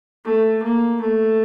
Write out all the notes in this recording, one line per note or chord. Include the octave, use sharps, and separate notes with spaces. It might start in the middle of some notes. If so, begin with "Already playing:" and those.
A3
A#3
A3